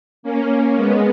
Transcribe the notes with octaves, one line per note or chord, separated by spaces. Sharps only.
A#3 C#4
G#3 B3